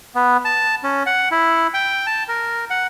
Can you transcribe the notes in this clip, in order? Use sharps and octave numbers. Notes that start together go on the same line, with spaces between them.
B3
A5
C#4
F#5
E4
G5
A5
A#4
F#5